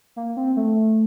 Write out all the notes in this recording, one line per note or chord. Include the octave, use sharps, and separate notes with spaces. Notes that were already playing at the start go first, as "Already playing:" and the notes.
A#3
C4
A3